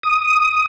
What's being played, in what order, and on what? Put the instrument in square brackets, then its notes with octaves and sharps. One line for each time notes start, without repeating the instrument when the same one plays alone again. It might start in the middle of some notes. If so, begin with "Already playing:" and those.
[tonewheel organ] D#6